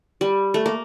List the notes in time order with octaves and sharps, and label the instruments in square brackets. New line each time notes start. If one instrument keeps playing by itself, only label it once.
[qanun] G3
A3
A#3